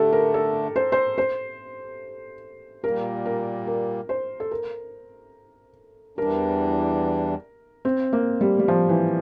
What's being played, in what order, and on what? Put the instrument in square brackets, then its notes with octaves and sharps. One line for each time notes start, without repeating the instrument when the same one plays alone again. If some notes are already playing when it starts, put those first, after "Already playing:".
Already playing: [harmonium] D3 A3 D4 [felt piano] G4 A4
[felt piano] A#4
A4
C5
C5
C5
[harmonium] A#2 G3 A#3 [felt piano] A#4
[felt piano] A#4
A#4
C5
A4
A#4
[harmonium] E2 E3 G3 D4 [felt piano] A#4
[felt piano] C4
A#3
G3
G3
F3
E3